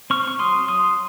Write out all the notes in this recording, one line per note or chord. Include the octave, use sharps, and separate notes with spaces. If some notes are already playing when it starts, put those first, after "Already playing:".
C4 C#6 F6
C#6
F#3 C6 D#6
F#3 C6 D#6